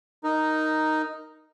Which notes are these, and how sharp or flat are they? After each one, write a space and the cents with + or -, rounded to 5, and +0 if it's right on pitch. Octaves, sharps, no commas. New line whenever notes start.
D#4 +0 A#4 +0